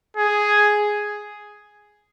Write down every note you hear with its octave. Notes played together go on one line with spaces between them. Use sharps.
G#4